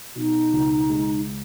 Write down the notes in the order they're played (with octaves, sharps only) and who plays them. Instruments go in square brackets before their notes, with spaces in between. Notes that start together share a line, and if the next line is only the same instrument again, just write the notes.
[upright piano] B2 [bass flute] D#4
[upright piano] C#2
G#3